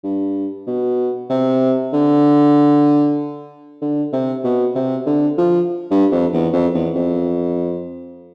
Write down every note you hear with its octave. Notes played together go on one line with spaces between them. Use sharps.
G2
B2
C3
D3
D3
C3
B2
C3
D3
F3
G2
F2
E2
F2
E2
F2